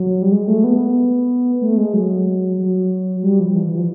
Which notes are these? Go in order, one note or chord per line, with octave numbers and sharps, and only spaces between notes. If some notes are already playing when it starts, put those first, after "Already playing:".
Already playing: F#3
G3
G#3
A3
B3
A3
G#3
F#3
F#3
G3
F3
E3
E3
F3